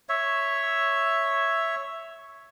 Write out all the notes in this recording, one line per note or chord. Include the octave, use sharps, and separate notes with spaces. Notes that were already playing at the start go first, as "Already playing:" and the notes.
C#5 E5